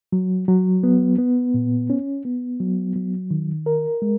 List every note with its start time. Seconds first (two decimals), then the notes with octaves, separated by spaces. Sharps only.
0.12 F#3
0.48 F#3
0.83 B3
1.18 B3
1.54 A#2
1.90 C#4
2.25 B3
2.60 F#3
2.96 F#3
3.31 D#3
3.66 A#4
4.02 G#3